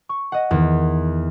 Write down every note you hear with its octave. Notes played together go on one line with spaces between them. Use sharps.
C#6
D#5 F#5
E2 D#3